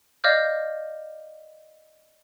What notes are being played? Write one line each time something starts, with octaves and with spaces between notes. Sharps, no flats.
D5 D#5 F5 D6 F6 G6